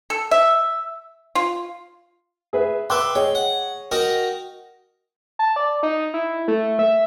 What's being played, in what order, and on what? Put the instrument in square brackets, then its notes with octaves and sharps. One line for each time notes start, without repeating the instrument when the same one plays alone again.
[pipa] A4
E5
F4
[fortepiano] G#4 B4 E5
[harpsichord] B4 E5 C6 [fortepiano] G5 D6 F#6
[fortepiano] G#4 C#5 D#5 [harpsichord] G5
[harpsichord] F#5
[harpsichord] D#4 F#4 A#4 [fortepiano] G5
[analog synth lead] A5
D5
D#4
E4
A3
E5